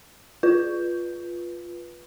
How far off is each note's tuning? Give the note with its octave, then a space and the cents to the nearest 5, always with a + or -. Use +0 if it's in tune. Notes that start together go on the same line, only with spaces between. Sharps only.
F4 +0 B4 -10